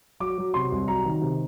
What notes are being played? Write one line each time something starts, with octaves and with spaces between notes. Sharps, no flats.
F#3 D6
F#3
C3 C6
C2
F#3 A#5
D#3
C3